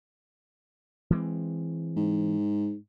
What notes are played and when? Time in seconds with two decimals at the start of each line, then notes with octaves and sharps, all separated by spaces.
1.10 E3 G#3 C4
1.97 G#2